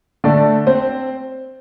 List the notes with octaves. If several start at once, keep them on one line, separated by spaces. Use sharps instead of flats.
D3 A3 D4 D5
C4 C5